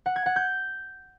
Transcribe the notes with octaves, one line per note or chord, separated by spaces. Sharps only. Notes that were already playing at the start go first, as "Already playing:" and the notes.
F#5
G#6
F#5
G6